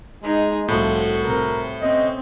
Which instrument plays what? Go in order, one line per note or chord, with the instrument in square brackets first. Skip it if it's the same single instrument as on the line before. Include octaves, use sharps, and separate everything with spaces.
[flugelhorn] G#3 [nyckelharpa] D#4 G#4
[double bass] C2 [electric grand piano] A2 [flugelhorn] F3 [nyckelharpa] F#4 A4
[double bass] C3 [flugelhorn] A#4
[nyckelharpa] C4 [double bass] C#4 [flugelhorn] D#5